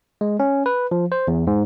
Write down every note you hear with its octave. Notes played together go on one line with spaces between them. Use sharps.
G#3
C#4
B4
F3
C5
E2
G#2